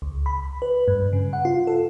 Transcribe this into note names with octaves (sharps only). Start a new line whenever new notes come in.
C#2
B5
B4
G2
C#3
F#5
F4
A4